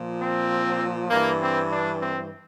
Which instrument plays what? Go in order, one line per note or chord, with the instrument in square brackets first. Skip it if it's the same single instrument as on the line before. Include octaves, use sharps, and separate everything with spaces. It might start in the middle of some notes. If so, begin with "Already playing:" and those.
Already playing: [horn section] A#2 F3
C4
G2 E3 A#3
C4
D4
C4